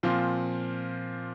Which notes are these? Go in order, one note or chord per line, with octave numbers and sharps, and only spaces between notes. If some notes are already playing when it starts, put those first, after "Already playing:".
A#2 F3 C4 F4